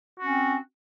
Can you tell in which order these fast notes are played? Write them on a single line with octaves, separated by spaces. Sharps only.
F#4 C#4 C4